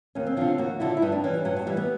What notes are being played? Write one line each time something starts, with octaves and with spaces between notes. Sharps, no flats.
D#2 C#4
C4
D3 F3 D4
F#4
D#2 F#4
D3 F3 E4
E4
G2 D#4
D4
E3 C#4
G3
G2 F#3
F#3
E3 G3
B3